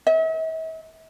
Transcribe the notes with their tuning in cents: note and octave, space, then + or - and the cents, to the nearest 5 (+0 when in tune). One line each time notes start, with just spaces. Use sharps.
E5 -45